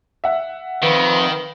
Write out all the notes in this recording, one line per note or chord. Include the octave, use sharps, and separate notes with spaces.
E5 F#5
F2 D#3 B4